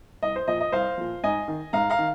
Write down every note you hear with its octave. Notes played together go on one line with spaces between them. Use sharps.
C2 D#5
C5
A#2 F3 D#5
D#5
C2 C5 F5
A#2 F3
G#2 D#5 G#5
D#3
G#2 F5 A#5
F5 A#5
D#3